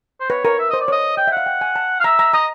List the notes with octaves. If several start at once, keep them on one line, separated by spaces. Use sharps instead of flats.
C5
B4 C#5
A#4 C#5
E5
C5 D#5
D5
C#5
D#5
D#5 G5
E5
F5 F#5
G5
G#5
A5
F5
E5 A#5
A#5
D#5 A#5